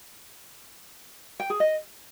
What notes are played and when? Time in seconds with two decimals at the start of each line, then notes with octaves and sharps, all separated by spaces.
1.40 G5
1.50 G#4
1.60 D#5